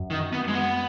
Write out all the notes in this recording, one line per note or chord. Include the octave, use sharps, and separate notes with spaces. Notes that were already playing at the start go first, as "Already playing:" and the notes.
Already playing: F#2
D#3
B3
G#3
B3